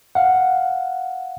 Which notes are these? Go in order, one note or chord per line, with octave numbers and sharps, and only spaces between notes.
F5 F#5